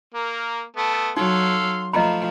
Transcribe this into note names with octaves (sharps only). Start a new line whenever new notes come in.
A#3 A#4
A3 B3 A5
F#3 D#4 A4 F5 C6
F3 A3 D#5 A#5 B5